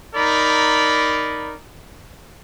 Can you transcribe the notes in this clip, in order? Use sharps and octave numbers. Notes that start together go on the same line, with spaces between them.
D#4 A#4 D5 B5